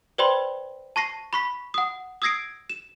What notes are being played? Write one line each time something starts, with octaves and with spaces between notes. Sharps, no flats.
B4 C5 D5 G5 B5 C6
A5 C#6 A#6 C7
B5 C#6 B6
F#5 D#6
D#6 E6 G#6 A#6 C7 D7
E7